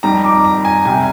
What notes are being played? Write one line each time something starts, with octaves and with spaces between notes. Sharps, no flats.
F2 D#3 G3 A#5
D6
A#5
G#5
C2 C3 G3 G#5